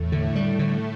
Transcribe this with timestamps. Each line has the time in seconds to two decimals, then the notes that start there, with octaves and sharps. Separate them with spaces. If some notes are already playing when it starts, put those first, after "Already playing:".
Already playing: E2 A2 A3
0.12 D3
0.35 G3
0.59 D3